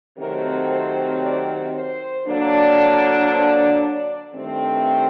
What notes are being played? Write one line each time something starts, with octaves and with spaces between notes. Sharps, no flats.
C3 D#3 F#3 A3 C4 A#4
C5
D5
C5
D3 F#3 A#3 D4
C5
D5
G2 D#3 A3 C4